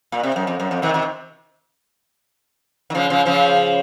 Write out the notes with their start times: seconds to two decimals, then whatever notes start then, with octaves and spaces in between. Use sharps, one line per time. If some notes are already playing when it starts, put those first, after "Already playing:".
0.12 A#2
0.23 C3
0.36 F#2
0.47 F2
0.60 F#2
0.71 F2
0.82 C3 D#3
0.94 C3 D#3
2.90 D#3
2.95 C#3 F3
3.10 C#3 F3
3.26 C#3 F3